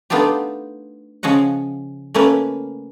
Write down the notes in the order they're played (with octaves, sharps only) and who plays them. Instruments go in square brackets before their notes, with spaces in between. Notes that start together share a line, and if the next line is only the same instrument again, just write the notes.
[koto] A3 B3 D4 D#4 F4 G4
C#3 F3 C#4 D#5 F#5
A3 A#3 C#4 B4